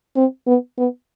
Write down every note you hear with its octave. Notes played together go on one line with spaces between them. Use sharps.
C4
B3
B3